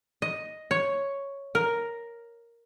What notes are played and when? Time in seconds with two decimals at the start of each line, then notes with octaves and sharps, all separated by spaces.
0.22 D#5
0.71 C#5
1.55 A#4